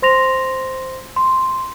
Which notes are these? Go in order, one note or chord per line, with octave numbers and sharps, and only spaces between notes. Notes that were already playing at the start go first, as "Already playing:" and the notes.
C5 C6 A#6 F7
C6